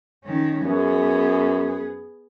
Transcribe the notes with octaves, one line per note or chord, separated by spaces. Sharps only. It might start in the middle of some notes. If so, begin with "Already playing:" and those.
D#3 C#4
F#2 B3 G#4